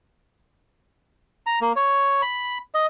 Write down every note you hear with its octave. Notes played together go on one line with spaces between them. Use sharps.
A#5
A#3
C#5
B5
D#5